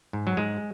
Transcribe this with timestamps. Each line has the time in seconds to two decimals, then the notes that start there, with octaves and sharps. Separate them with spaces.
0.13 G#2
0.27 F#3
0.37 G#2 G#3